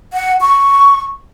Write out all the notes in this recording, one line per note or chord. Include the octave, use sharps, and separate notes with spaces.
F#5
C#6